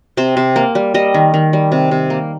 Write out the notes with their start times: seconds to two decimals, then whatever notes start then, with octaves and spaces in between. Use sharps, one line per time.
0.17 C3 C5
0.37 C3
0.56 A#3
0.75 G3
0.94 G3 D#5
1.14 D#3
1.34 D#3
1.53 G3
1.72 C3
1.91 C3
2.10 A#3